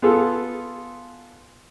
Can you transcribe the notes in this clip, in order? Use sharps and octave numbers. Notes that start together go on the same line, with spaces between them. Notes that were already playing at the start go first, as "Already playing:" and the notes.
B3 F4 G#4 A4